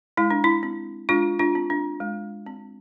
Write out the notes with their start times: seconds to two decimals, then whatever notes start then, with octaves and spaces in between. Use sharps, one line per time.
0.17 G#3 E4
0.30 D4
0.44 E4
0.63 C4
1.09 G#3 D4 F4
1.39 D4 F4
1.55 C4
1.70 D4
2.00 G#3
2.46 C4